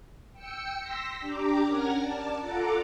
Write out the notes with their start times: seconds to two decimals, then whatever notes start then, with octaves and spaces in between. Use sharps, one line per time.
0.33 G5 E6 C#7
0.80 C6 E6 A#6 B6
1.20 D4 G4 A#5 D6
1.65 C#4 A#4 F#5 F6 G#6 A#6
1.96 D5 A5
2.40 F4 A4 F#5 A#5 D6